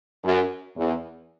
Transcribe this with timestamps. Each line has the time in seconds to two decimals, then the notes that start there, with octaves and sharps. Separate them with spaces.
0.24 F#2
0.77 E2